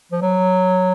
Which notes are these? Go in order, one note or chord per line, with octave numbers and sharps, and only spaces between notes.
F3
F#3